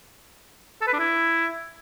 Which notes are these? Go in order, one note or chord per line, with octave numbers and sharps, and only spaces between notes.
A4
B4
D4
E4